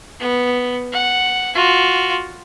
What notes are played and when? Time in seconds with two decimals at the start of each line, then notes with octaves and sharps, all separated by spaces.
0.20 B3
0.92 F#5
1.54 F4 F#4